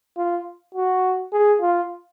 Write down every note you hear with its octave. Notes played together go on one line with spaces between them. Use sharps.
F4
F#4
G#4
F4